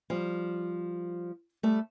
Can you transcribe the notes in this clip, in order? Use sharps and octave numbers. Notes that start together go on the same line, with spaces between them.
F3 G3
G3 A3